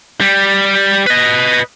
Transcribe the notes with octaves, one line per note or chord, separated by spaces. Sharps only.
G3
B4 D#5